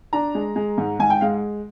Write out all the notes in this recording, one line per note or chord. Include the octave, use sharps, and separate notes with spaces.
D4 A#5
G#3
G#3
G#2
G#2 G#5
G5
G#3 F5